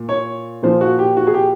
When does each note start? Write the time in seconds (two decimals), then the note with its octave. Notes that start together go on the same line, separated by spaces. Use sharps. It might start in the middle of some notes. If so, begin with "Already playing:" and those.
Already playing: A#2
0.09 C#5
0.62 A#2 F3 C5
0.81 F#4
0.99 G4
1.17 F#4
1.27 G#4
1.34 G4